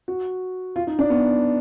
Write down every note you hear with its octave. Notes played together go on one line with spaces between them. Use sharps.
F#4
F4
D#4
D4
B3